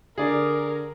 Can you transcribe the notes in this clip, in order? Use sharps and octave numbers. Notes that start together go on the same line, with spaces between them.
D3 G#4 A#4 D5